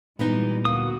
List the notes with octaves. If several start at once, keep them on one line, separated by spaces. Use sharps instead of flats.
A#2 E3 G3 G#3 A#3 B3 D#4 B4
D2 A#3 B3 F#4 D#6